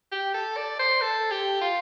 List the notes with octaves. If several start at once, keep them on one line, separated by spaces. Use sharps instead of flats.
G4
A4
D5
C5
A4
G4
F4